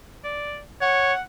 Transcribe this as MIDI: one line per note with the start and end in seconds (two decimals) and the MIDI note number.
0.24 0.62 74
0.82 1.13 73
0.82 1.21 78